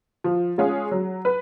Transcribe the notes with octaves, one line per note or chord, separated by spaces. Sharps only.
F3
G#3 C#4 F4 G#4
F#3
B4